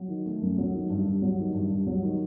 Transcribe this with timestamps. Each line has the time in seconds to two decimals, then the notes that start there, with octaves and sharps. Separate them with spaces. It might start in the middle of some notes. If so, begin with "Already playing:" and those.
Already playing: F#3
0.08 D#3
0.26 A3
0.42 F#2
0.58 F#3
0.74 D#3
0.90 G2
1.06 G2
1.22 F#3
1.39 D#3
1.54 G2
1.71 G2
1.87 F#3
2.03 D#3